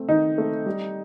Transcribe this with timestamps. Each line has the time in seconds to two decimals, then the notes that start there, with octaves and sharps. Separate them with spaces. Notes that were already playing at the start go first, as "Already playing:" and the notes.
Already playing: A3 C4
0.09 D#3 D#4
0.38 A3 C4
0.66 G3